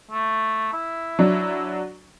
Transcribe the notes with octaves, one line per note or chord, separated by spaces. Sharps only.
A3
E4
F#3 D4